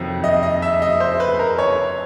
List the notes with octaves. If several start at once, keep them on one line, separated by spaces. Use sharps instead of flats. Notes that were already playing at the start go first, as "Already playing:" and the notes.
Already playing: F2 C3 D#3 F#3
D#5
D#5
E5
D#5
C5
B4
A#4
C#5